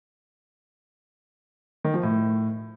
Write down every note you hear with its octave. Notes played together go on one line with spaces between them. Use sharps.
D#3
F3
A2